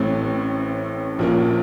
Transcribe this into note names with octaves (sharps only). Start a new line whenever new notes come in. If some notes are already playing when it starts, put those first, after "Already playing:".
Already playing: A1 A2 A3 C4
A#1 A#2 F3 A#3 C#4